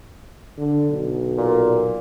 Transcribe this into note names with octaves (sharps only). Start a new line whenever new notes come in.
D3
B1
A#2